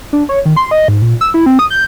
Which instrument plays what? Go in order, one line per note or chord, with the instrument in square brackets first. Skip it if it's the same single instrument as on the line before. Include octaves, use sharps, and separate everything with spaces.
[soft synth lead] D4
C#5
D#3
C6
D#5
G#2
A#2
E6
E4
C4
D#6
G6